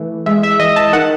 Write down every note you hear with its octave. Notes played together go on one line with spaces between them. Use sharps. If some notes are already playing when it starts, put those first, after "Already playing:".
Already playing: E3 A3
G#3 E5
E5
E3 D#5
A5
D#3 F#5